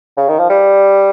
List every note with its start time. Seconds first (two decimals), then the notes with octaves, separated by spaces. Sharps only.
0.17 C#3
0.29 D#3
0.39 F3
0.50 G3